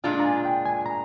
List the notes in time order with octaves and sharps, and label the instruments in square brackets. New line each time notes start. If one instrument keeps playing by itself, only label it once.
[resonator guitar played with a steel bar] A#2 G#3 D4 F4 [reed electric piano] F5
[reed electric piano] A#5
G#5
G5
G#5
A#5